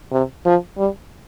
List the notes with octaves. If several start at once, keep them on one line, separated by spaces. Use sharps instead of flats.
C3
F3
G3